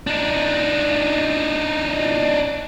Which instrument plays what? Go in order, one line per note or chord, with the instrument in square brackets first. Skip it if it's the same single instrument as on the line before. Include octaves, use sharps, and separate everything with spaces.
[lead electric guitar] D4 D#4